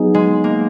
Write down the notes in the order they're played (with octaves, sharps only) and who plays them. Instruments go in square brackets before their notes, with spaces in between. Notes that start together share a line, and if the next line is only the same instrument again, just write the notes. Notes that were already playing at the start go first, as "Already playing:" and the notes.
Already playing: [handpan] F#3 B3 D#4 G#4
[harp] G#3
A#3